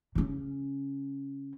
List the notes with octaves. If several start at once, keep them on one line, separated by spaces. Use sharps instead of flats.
C#3 C#4